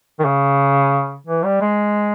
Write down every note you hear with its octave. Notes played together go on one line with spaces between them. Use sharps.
D#3
C#3
E3
G3
G#3